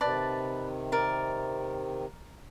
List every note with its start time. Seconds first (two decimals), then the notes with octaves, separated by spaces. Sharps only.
0.01 C3 D#3 B4 D5 A5
0.92 A#4 D5